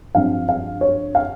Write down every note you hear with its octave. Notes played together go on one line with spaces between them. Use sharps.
G2 F3 C4 F5
F5
C#5
F5